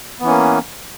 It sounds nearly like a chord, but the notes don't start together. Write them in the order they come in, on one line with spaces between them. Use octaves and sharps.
B3 E3 C#4 A#3